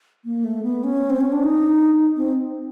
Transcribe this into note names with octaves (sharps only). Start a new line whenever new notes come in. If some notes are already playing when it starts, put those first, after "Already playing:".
A#3
A3
B3
C#4
C4
C#4
D4
D#4
C4